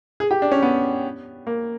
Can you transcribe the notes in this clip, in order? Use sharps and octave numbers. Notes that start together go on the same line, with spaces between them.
G#4
G4
D4
C#4
B3
A#3